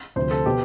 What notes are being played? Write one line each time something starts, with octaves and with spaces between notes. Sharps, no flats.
D2 C3 F3 C5
A4
B2 G4